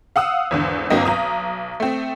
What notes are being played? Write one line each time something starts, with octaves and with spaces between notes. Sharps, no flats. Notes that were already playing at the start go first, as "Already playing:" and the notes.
F5 F#5 D#6 E6
G#1 E2 D3
G1 D3 F#3 A#3 C4 D#5
B1 A#5 D#6
A3 C4